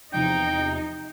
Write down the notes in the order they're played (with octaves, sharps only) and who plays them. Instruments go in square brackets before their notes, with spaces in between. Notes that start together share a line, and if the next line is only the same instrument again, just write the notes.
[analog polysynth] E2 C3 F3 [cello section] D#4 [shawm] G5